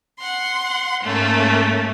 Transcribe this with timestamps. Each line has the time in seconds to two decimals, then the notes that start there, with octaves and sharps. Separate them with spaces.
0.19 F#5 C6
1.02 G#2 A3 A#3 C#4